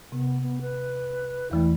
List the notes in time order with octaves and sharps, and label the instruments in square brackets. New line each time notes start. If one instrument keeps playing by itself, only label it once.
[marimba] C3 [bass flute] B3
[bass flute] B3
B4
[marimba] E2 E3 A3 [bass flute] E4